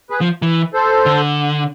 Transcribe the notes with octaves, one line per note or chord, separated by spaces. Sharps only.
G#4 B4
F3
E3
A4 C5
D3